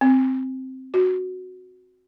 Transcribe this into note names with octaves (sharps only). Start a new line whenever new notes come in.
C4
F#4